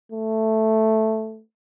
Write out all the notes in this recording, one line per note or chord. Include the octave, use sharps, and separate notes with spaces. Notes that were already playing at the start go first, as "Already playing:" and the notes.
A3